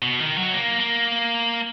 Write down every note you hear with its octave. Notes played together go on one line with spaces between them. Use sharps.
B2
D#3
F#3
A#3
A#3